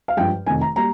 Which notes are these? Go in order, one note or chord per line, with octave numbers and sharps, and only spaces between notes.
F5
G2 F3 G#3 G5
F1 F2 D#3 G#5
A#5
G3 A#3 A#5